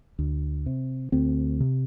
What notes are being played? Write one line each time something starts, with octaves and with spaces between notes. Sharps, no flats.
D2
C3
D2 C4
C3